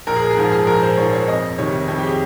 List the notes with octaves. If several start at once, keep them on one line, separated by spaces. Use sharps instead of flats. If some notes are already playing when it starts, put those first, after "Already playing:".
A#1 A#4
G#4
A#4
G#4
G#2 F3 A#4
G#4
A#1 A#4
C5
G#2 F3 C#5
C#5
F2 D#5
C3 D#3 G3 C#5
F2 C#5
G4
G#4